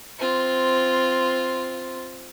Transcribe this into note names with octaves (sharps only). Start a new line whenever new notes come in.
C4 F4